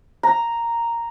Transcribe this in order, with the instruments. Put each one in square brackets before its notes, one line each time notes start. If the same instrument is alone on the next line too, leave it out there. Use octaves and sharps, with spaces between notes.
[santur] A#5